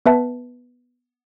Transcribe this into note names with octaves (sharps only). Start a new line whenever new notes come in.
B3 B4 E5 A5